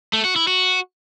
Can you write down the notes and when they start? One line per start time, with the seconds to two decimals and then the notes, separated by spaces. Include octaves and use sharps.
0.13 A3
0.25 F#4
0.36 E4
0.48 F#4